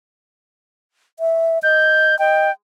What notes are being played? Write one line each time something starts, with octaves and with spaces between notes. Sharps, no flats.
E5
D#5 G6
D#5 G5